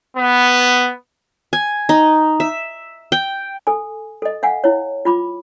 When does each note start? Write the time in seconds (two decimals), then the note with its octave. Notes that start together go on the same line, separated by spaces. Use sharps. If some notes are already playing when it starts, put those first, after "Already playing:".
0.17 B3
1.53 G#5
1.89 D#4
2.40 E5
3.12 G5
3.67 A4 G#5
4.22 A4 D#5
4.43 F5 F#5 G#5
4.64 E4 C#5
5.05 F4 B5 D6